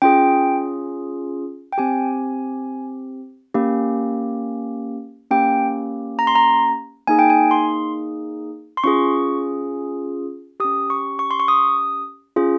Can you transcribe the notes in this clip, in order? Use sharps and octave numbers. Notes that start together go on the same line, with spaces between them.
C#4 F4 G#4 G5
G5
C4 G4 G#5
A#3 C#4 G4
A#3 C#4 G4 G5
A#5
C6
A#5
A#3 D#4 G#4 G#5
G5
G#5
C6
C6
C#4 F4 G#4 C#6
C#4 G4 D#6
C#6
C#6
C6
C#6
D#6
C#4 F4 G#4